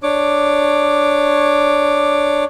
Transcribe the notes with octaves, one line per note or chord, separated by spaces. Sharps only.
D4 C#5 D6